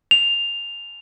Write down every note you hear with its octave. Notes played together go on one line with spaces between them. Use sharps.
F7